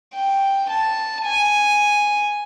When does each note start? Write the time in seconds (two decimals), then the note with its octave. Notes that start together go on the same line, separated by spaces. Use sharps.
0.14 G5
0.69 A5
1.25 G#5